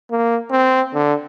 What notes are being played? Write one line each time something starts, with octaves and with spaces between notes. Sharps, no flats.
A#3
C4
D3